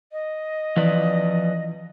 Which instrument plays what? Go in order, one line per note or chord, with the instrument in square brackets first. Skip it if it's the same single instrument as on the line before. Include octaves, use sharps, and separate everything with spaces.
[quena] D#5
[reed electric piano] E3 [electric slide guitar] F3 B4 D5